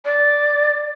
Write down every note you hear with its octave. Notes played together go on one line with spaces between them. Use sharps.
D5